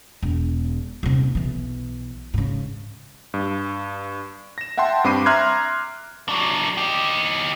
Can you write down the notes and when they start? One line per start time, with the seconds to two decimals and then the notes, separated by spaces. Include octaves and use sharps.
0.23 E1
1.03 D#1 C3
1.35 B1 E3
2.34 G#2 C#3
3.34 G2
4.58 A#6 E7
4.77 E5 F#5 G5 A5 C6
5.04 G2 C4 B5 D6 C7 D#7
5.26 E5 A#5 C6 F6 F#6 G#6
6.29 F#3 D4
6.77 D#4 G4